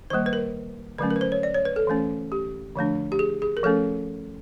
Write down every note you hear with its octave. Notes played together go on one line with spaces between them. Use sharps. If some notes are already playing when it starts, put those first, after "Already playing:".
D#3 G3 A#3 C5
B4
A#4
D3 F#3 A3 C#4 B4
A#4
B4
C5
C#5
D5
C#5
B4
A4
E3 A3 C#4
G4
D3 F3 A3 D4
G4
G#4
G#4
A#4
F3 A3 C#4 A4